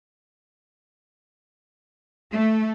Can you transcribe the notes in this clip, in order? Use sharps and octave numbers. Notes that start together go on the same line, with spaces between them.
A3